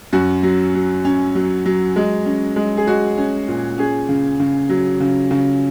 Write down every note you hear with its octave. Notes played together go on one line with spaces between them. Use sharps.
F#2 F#4
F#3
F#3
C#4
F#3
F#3
G#3
C#4
G#3
G#4
G#3 F#4
C#4
A#2
C#4 G#4
C#3
C#3
F#3
C#3
C#3